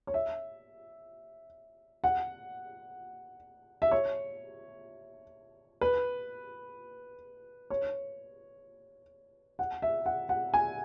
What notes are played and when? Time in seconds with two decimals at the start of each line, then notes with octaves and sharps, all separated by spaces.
0.07 C#5
0.14 E5
2.04 F#5
3.82 E5
3.91 C#5
5.81 B4
7.70 C#5
9.59 F#5
9.82 E5
10.06 F#5
10.29 F#5
10.54 G#5